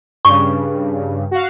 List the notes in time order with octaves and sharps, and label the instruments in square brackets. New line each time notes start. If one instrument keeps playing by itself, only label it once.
[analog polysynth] G2 C#3 [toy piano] C#6
[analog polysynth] F#4 F5